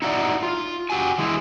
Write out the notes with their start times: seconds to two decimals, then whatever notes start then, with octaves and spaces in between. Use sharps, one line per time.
0.02 D#4 E4 F#4 D5 D#5
0.43 F4
0.90 F#4 G4 G#5
1.18 E3 G#3 E4